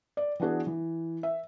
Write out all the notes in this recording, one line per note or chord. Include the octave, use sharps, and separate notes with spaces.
D5
E3 B3 D4 F#4 G#4
E3
E5